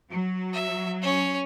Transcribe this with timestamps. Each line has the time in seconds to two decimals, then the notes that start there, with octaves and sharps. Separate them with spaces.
0.10 F#3
0.53 E5
1.02 C#4 C#5